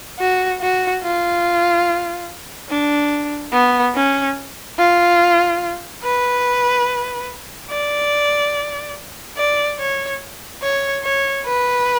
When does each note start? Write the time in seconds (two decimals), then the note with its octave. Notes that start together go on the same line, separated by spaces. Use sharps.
0.19 F#4
0.61 F#4
1.03 F4
2.70 D4
3.53 B3
3.95 C#4
4.78 F4
6.03 B4
7.70 D5
9.37 D5
9.79 C#5
10.62 C#5
11.04 C#5
11.46 B4